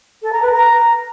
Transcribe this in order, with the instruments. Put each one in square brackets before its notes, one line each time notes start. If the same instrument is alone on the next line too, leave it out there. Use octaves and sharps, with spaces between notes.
[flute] A4
A#5
B4
A#5